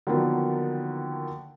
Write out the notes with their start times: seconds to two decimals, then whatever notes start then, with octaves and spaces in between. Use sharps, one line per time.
0.07 D3 D#3 F3 F#3 A#3 B3